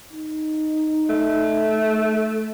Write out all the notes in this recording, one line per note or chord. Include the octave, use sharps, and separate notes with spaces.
D#4
A3